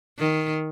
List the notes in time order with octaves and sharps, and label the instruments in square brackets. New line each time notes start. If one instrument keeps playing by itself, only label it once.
[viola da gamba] D#3